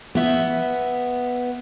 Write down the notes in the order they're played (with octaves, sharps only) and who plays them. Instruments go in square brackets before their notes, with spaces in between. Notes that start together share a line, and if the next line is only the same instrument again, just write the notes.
[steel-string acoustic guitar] B3 E5